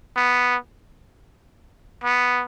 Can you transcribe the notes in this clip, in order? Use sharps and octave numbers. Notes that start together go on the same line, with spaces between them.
B3
B3